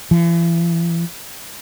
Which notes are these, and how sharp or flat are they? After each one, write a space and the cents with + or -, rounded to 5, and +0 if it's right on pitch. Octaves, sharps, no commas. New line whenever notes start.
E3 +40